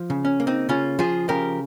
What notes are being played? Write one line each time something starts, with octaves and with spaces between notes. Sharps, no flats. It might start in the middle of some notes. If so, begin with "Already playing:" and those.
Already playing: F3
C#3
C#4
A#3
C4 D#4
C#3 C#4 F4
F3 F4 G#4
C#3 G4 A#4